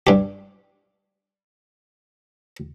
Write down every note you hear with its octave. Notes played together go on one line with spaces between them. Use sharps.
G2 G4